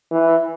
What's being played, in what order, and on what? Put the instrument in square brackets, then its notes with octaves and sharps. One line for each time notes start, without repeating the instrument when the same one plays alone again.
[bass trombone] E3